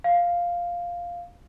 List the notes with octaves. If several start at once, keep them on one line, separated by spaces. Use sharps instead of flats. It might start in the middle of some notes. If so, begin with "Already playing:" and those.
F5